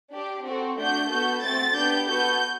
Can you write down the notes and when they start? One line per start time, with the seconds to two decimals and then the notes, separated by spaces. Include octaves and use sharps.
0.13 D4 G4
0.46 C4 F#4 A4
0.78 A3 D4 F#4 G6
1.11 B3 F#4 A4 G6
1.44 A3 C4 F#4 A6
1.76 B3 D4 G4 G6
2.08 B3 F#4 A4 G6